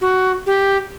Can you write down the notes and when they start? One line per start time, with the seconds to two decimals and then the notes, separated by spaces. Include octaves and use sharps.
0.01 F#4
0.46 G4